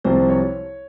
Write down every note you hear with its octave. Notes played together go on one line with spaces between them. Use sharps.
C2 C3 F3 C5
C#5